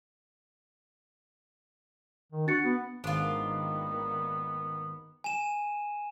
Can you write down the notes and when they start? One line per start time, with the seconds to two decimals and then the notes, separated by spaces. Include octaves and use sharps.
2.32 D#3
2.47 D4 F#4 A6 C#7
2.64 B3
3.04 G#1 D#3 A#3 B3 D4 F4
5.24 G#5 D#7 E7